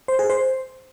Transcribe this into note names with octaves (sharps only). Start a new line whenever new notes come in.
C5
G#4
C5